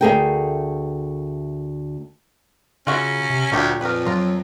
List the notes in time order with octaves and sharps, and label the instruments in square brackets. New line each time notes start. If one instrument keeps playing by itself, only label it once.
[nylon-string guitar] D2 F#3 A3 G#4 A#4 G5
[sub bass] C#3 [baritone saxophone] C#4 [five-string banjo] F4 F#4 E5
[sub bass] C3
[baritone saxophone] D2 [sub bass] A#2 [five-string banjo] F#3 G4
[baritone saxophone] F2 [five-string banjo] A#4 B4
[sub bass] F#3 [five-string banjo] F4 A#4